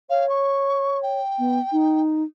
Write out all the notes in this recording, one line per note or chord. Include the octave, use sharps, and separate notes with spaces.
C#5 F5
C#6
G5
B3
D#4